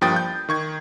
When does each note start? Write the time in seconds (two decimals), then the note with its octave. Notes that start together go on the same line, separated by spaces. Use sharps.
0.01 G2 F3 A#3 G5 D#6 A6
0.16 G6
0.49 D#3 C#6 G#6